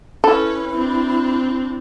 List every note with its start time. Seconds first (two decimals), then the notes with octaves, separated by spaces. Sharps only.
0.24 C#4 E4 A4 B4
0.74 C4 D4